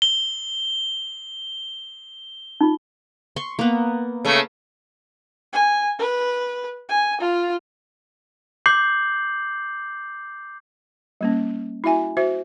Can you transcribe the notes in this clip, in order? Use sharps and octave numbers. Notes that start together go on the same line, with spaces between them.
G7
D#4 F4
C6 C#6
A#3 B3
C#3 A3
G#5
B4
G#5
F4
D6 G6 C7 F#7
G3 A#3 C#4
E4 F#4 E5 G#5
F#4 C5 E5